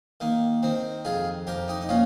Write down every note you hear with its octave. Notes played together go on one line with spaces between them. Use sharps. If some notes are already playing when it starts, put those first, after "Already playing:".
D#3 A#3
D#3 C4
F2 F4 G#4
F2 G4 A#4
D#4 G4
D#4
A#2 C#4 F4